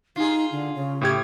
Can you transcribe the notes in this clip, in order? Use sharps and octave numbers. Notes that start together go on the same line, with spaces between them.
D#4 F4 G#4
D3
C#3
A2 G4 G#6